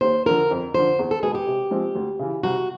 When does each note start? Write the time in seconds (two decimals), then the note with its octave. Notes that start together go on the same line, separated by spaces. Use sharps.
0.01 D#2 C5
0.26 D3 F3 A#4
0.51 F2
0.74 D3 F3 C5
0.99 E2
1.11 A4
1.22 B2 G#3 B3 G#4
1.35 G4
1.47 C3
1.71 F3 G#3 C4
1.95 D2
2.19 C#3 E3
2.43 C2 F#4